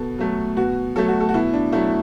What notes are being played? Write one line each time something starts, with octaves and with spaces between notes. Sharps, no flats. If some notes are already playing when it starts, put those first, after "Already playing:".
Already playing: B2 A4
F#3 A3
B2 F#4
F#3 A3 A4
F#4
A4
F#4
B2 E4
D4
F#3 A3 E4